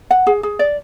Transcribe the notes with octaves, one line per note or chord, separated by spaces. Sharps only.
F#5
G#4
G#4
D5